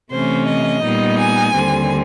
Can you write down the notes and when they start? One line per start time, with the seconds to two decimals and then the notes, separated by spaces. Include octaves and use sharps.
0.11 C3 E3 A3 C#4 C5
0.47 D#5
0.82 A#2 G3 B3 D#4
1.18 G#5
1.55 D#2 D3 G3 C4